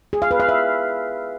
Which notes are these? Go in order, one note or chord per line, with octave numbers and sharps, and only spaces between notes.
G#4
F5
B4
F5
E5